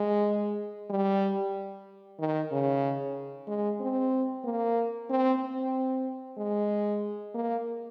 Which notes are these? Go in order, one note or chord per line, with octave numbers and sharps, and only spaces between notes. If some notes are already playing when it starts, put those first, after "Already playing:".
Already playing: G#3
G3
D#3
C#3
G#3
C4
A#3
C4
C4
G#3
A#3